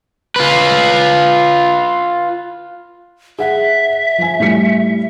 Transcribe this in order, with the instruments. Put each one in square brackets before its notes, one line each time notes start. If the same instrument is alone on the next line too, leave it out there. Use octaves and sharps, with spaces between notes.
[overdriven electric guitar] F4 B4
[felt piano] G#4 F#5 [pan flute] E5
[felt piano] F3 G#5
A2 G3 C#7